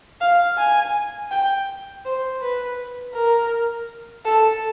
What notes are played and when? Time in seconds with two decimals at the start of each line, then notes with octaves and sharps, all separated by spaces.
0.21 F5
0.58 G#5
1.31 G5
2.05 C5
2.41 B4
3.14 A#4
4.25 A4